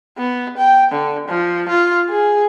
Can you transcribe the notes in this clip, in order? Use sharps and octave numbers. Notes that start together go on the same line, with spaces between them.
B3
G5
D3
F3
F4
G#4